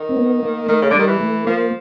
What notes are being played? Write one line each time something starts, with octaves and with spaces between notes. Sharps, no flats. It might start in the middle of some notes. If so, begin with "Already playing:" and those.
Already playing: D#3
C4
B3
A#3
D#3 A3
C#3
D3
G3
D#3
E3
A3
F3 A#3